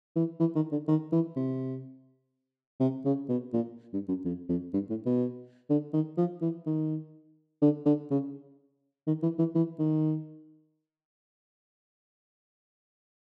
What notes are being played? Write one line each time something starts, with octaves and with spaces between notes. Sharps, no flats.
E3
E3
D#3
D3
D#3
E3
C3
C3
C#3
B2
A#2
G2
F#2
F2
F2
G2
A2
B2
D3
D#3
F3
E3
D#3
D3
D3
C#3
D#3
E3
E3
E3
D#3